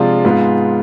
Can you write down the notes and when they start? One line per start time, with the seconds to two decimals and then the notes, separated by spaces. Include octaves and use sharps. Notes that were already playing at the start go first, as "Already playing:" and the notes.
Already playing: C3 F3 G#3 D4 F4
0.25 G#2 G#3 B3 F4